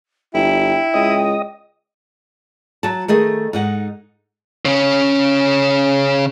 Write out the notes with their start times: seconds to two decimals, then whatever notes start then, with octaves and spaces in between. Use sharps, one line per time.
0.34 G1 E4 G5
0.94 C#2 D#5
2.83 F#3 A5
3.08 D#3 A3 G#4 D#5
3.53 G#2 D#4 F#5
4.65 C#3 C#4